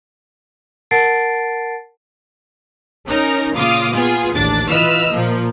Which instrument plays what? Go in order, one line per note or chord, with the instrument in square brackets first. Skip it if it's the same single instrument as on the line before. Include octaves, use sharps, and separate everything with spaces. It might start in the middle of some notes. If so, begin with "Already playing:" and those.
[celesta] A#4 F#5 A5 A6 C7 D7
[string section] C#4 D#4 A#4 A#5
A#2 C#3 F4 F5 D6 D#6
B3 F4 G#4
A1 D#2 D4 A6
E3 F4 B4 D#5 E6 F6
A#2 F3 A#3